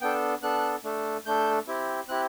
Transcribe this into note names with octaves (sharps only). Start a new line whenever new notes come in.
B3 D4 A4 G5
B3 D4 A4 F#6
A3 D4 A4
A3 D4 A4 G6
C4 E4 G4
C4 E4 G4 F#6